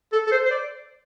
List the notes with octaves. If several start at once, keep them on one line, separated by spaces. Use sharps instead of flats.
A4
A4
C5
C5
D5